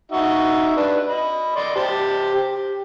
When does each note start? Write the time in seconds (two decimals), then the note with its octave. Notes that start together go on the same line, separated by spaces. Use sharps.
0.12 D#4 F#4 E5
0.76 D4 B4
1.09 D#5 B5
1.56 D5 D#5 C6
1.76 G4 C5 A5
2.35 G4